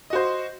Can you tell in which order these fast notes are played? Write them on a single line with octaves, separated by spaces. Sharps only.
D#5 F#4 C5